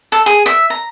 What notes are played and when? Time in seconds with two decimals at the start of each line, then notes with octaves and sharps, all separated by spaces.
0.12 A4
0.26 G#4
0.46 E5
0.70 A#5